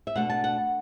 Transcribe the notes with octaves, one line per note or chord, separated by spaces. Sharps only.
E5
B2 A3 D4 F#5
A5
F#5